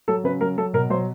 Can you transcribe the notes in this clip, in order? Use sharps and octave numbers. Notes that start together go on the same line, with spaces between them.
F#3 A4
C#3 B4
F#3 A#4
F#3 A4
B2 A#4
F#3 C5